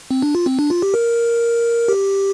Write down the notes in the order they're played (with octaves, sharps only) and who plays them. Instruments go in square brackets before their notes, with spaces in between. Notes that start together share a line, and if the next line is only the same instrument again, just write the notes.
[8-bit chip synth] C4
D4
F4
C4
D4
F4
G4
A#4
G4